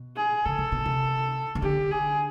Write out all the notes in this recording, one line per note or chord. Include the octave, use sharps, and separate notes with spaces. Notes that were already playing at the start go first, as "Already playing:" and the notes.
Already playing: B2
G#4
C#3 A4
C3
B2
C3
C#3
D3 G4
G#4